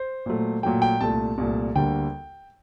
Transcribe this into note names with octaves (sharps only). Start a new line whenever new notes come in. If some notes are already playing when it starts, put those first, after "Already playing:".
Already playing: C5
A#2 F#3 A3
A#2 F#3 A3 G5
G5
C2 A#2 A3 A5
C2 A#2 A3
D2 D3 G3 A#3 G5